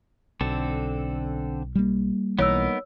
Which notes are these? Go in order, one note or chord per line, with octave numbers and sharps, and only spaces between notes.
B1 D3 C4 A4
G3 A#3
B1 E3 B3 D#4 A#4 C#5 E6